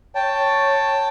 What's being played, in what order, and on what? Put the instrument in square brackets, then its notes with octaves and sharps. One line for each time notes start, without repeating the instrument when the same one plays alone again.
[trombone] C#5 [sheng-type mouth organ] G5 A5